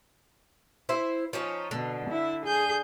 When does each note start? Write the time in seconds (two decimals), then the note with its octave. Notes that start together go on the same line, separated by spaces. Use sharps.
0.89 E4 C5 E5
1.33 F3 C#4 D#4
1.71 B2 D3
2.10 E4
2.45 G#4 G6